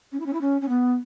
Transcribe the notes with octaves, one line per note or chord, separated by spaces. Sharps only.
C#4
E4
C#4
E4
C#4
C#4
B3